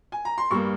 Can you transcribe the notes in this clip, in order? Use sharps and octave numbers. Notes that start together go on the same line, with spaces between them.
G#5
A#5
C6
G2 G3 A#3 C#6